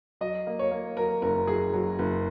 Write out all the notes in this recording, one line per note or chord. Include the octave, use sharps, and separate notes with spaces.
F#3 D#5
A#3
C#5
A#3
F#3 A#4
F#1 A#4
F#3 G#4
F#3
F#1